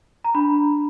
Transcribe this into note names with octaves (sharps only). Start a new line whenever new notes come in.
A#5
D4 B5